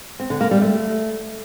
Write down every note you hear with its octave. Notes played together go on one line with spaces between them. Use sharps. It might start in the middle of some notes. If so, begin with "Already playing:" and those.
C4
D3
A#3
G3
A3